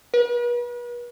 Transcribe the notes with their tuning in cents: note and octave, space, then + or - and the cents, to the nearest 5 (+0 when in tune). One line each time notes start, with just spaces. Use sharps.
B4 -40